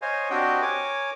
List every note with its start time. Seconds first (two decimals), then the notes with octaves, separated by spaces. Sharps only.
0.02 C5 C#5 D#5 F5 G#5
0.30 C4 D4 F#4 G4 D#5 G5
0.62 A#4 C#5 G#5 D6